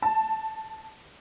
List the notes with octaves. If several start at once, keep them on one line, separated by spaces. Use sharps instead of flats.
A5